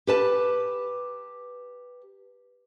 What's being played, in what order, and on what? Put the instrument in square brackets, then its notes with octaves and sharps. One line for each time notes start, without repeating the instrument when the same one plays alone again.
[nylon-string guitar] G4 B4 A5